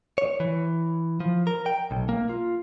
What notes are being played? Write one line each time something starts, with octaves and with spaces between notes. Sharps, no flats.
C#5
E3
F3
A#4
G5
B1
A#3
F4